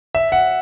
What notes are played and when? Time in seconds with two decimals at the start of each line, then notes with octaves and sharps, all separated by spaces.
0.15 E5
0.32 F#5